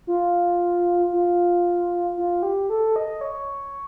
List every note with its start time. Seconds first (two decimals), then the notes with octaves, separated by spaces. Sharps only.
0.07 F4
1.13 F4
2.17 F4
2.43 G4
2.70 A4
2.96 D#5
3.21 C#5